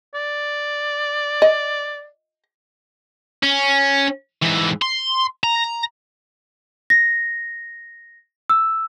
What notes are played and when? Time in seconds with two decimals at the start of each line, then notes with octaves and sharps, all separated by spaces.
0.14 D5
1.42 D#5
3.43 C#4
4.43 G#2 E3
4.82 C6
5.44 A#5
6.90 A#6
8.50 E6